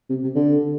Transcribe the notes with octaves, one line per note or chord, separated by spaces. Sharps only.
C3
C3
D3